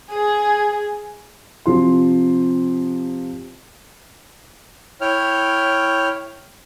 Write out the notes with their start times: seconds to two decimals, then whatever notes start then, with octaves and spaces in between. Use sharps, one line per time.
0.13 G#4
1.66 C3 F3 C6
5.01 E4 C#5 G5 F6